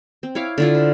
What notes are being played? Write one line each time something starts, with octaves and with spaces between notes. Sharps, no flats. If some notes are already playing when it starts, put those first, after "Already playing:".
C4
E4 C#5 F5 D6
D3 E4 F4
C5